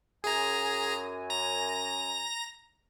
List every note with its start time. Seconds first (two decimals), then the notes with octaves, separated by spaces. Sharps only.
0.24 F#2 G#4 G#5 A#5
1.30 A#5 A#6